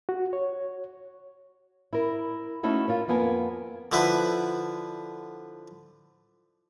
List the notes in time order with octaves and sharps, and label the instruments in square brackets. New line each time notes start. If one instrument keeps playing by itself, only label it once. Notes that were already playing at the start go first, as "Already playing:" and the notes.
[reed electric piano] F#4
C#5
[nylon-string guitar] E4 A#4
A3 C#4 D#4 E4 F#4 A4
F4 A#4 C#5
F2 A#3 B3 A#4 G#5
[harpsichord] D3 F3 E4 B4